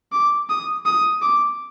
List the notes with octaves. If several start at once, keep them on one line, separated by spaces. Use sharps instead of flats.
D6
D#6
D#6
D6